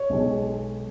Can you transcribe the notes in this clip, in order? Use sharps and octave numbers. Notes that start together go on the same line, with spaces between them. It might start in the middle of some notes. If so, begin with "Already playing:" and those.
Already playing: C#5
B1 B2 G#3